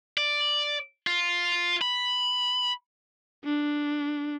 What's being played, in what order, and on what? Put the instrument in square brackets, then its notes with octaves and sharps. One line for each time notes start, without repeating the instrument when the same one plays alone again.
[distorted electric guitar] D5
F4
B5
[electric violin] D4